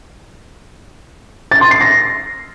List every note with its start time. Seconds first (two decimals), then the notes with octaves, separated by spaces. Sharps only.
1.51 A6
1.61 C6
1.71 C7
1.81 A#6